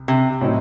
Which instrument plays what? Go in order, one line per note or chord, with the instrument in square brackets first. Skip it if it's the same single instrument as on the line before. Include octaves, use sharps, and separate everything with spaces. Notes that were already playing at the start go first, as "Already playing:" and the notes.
Already playing: [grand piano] C2
[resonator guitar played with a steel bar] C3
[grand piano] A2 F#3 C4 D#4